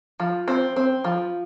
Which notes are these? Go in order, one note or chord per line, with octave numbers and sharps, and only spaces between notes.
F3
C4
C4
F3